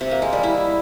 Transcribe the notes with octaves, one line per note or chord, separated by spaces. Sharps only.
C3
A#3
G#3
G3
E4